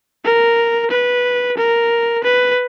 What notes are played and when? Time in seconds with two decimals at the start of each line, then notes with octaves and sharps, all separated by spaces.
0.25 A#4
0.91 B4
1.57 A#4
2.24 B4